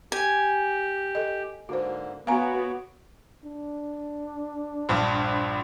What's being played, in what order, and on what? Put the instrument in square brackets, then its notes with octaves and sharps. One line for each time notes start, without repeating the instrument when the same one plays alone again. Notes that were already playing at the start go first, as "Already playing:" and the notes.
[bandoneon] G4 [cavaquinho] G#5
[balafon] A4 D#5
[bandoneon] G#2 D3 A#3 [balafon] F#4 C5
[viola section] B3 F#4 [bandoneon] C#5 D6 [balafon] F5 G#5 A#5
[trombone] D4
[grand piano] A#1 G2